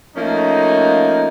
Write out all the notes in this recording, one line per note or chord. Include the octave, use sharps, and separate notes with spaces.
F3 A3 A#3 C#4 D#4